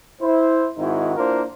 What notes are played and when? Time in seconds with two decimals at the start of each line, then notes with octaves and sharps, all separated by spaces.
0.22 E4 C5
0.78 G#2 D#3 C4 D#4 E4 F#4
1.16 A#3 D4 E4 F4 A#4 C5